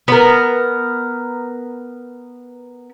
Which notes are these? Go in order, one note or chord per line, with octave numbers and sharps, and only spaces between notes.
B3 A#4